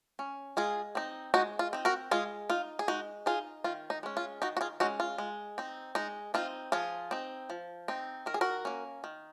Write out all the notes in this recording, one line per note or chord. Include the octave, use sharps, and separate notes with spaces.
C#4
G#3 F4 G#4
C4 D#4
G#3 D#4 F#4
F4
C4 D#4
F#4 A#4
G#3 F4 G#4
D#4 F4
G#4
G#3 D#4 F#4
D#4 F4 G#4
D#3 F4
D#4
G#3 C#4
F4
D#3 D#4 F#4
F#4
F4 G#4
G#3 C#4 D#4 F#4
F4
G#3
C4 D#4
G#3 D#4
C4 D#4 F4
F3 F4 G#4
C4 D#4
F3
C4 D#4
D#3 A#4
G#4
F#4 A#4
A#3 C#4
D#3